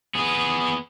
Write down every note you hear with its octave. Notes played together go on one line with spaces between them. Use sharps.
B3 G#4